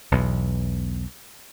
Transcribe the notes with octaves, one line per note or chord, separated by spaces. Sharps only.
B1 E2 B2